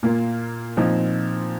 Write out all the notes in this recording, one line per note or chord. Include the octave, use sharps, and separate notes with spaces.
A#2 A#3 F4
A#2 F3 C4 D#4